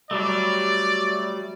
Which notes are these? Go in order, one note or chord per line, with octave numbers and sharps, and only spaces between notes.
F#3 G3 A3 D5